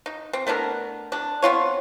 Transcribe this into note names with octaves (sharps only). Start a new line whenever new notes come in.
D#4
C4
A3 B3 D4 A#4
C3 D4
B3 C4 F4 C#5